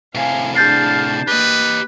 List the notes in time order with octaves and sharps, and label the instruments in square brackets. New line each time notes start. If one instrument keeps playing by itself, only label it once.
[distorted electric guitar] A2 C3 [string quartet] F5 G#5
[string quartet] D4 G#4 A5 [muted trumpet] F5 [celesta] G6 A6 C7
[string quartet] A#3 [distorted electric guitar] G4 D#5 [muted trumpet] B4